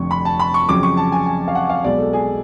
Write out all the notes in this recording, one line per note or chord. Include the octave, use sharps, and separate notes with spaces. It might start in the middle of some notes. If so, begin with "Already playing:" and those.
Already playing: F1 F2 D3 C#6
B5
A5
B5
C#6
F2 C#3 F#3 D6
C#6
A5
G#5
G#5
F5
F#5
F5
B1 B2 G#3 D5
A4
G#4